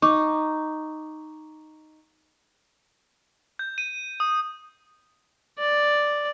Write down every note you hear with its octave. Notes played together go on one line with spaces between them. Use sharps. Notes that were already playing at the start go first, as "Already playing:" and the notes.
D#4 C#6 D6
G6
D#7
D#6
D5